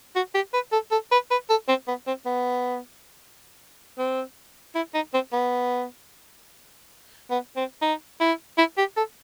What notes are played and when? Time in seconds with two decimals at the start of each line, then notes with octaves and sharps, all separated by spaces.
0.16 F#4
0.35 G4
0.53 B4
0.72 A4
0.91 A4
1.12 B4
1.31 B4
1.50 A4
1.68 C4
1.88 B3
2.07 C4
2.26 B3
3.98 C4
4.75 E4
4.94 D#4
5.14 C4
5.33 B3
7.30 B3
7.56 C4
7.82 D#4
8.21 E4
8.58 E4
8.78 G4
8.97 A4